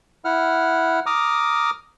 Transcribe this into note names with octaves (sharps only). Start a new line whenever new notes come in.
E4 F#5 F6
A#5 D6 D#6 F6